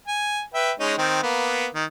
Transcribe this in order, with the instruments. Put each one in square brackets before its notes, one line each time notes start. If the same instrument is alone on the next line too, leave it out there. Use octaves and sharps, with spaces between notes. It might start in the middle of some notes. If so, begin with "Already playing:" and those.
[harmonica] G#5
B4 E5 G5
G#3 C#4 D#4
D#3 C4
A#3 B3
D#3